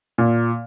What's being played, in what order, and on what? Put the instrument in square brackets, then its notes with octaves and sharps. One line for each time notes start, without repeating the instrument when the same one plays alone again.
[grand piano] A#2